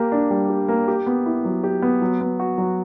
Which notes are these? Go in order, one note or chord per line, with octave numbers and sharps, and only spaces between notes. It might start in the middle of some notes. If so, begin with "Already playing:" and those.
Already playing: A#3 G4
D4
G3
G4
A#3
G4
B3
E4
F#3
G4
B3
F#3
B3
F#4
F#3